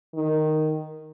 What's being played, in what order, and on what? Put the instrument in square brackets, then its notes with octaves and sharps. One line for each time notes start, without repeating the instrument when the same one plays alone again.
[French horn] D#3